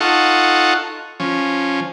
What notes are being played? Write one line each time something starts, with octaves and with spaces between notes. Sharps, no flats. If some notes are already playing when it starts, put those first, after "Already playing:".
D#4 F4 A4 F#5 C#6
F3 C#4